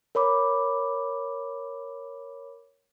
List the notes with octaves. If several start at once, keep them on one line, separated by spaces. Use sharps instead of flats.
A#4 C#5 B5 D6